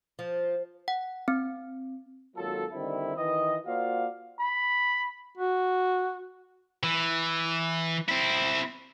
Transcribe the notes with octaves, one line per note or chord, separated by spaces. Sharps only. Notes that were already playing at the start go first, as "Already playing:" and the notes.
F3
F#5
C4
G#1 F#3 A#3 F4 A4
D3 D#3 G3 C4 E4
D#3 E3 D#5
A#3 F4 F#4 C5 D5 F5
B5
F#4
E3
C4 E4